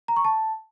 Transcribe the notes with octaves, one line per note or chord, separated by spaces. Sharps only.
A#5
C#6
A5